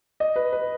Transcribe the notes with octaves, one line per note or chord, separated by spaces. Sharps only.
D#5
B4
B4